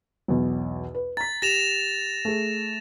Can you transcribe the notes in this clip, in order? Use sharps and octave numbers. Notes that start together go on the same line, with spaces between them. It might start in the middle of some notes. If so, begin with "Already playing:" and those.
B1 E2 B2
B4
A#5 A6 B6
G4 A#6 E7 F7
A3 G#4